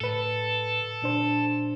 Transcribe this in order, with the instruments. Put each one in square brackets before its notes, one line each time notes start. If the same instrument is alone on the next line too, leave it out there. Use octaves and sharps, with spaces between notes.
[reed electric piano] A2 B4 [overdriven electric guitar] A4
[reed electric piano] A#2 D4 C5